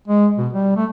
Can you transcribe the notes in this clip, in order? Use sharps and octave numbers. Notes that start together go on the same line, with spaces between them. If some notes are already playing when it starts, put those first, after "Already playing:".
G#3
B2
G3
A3